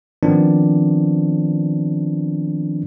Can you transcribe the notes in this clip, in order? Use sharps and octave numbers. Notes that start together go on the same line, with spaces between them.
D#3 F3 B3 C4 D4